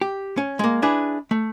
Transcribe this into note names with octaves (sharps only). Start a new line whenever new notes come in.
G4
C#4
G#3 A#3
D4 E4 G#4 B4
A3